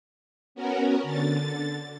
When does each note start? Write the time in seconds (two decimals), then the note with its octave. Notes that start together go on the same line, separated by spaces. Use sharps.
0.55 B3 C#4 F#4 A#4
1.03 D3 A6